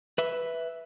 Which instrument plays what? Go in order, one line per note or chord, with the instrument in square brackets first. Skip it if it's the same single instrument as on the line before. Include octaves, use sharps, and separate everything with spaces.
[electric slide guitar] B4 E5